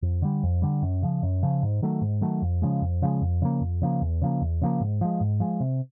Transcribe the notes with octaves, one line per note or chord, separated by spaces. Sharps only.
F2
D3 G3
F2
D3 G3
F#2
C#3 F3
F#2
C#3 F3
G#2
D#3 F#3 A3
G#2
D#3 F#3 A3
F2
C#3 F3 G#3
F2
C#3 F3 G#3
F2
C#3 F3 A#3
F2
C#3 F3 A#3
E2
C#3 F3 A#3
E2
C#3 F3 A#3
G#2
F3 G#3
G#2
F3 G#3
C3